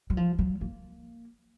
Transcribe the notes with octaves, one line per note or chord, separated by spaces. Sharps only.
F#3
F3
F#3
A#3